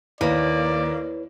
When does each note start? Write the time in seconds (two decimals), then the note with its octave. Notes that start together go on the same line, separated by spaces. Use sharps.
0.21 D#2 A#3 E4 B4 C#5 D5